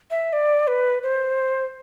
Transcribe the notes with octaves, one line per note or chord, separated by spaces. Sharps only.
E5
D5
B4
C5